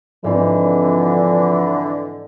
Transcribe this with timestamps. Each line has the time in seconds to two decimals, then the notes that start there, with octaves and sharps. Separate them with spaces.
0.24 G#2 D3 E3 F3 C4